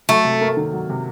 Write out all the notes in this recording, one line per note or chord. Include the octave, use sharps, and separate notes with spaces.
F#3 A3
C3
A#3
D#3
F#3
C3